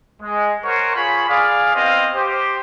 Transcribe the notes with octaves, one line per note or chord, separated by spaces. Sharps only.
G#3
A#4 C5 C#5 F#5 G#5 C#6
F4 G#4 C#5 B5
G#4 D5 F5
B3 C4 E4 C5 D#5 F5
G4 C5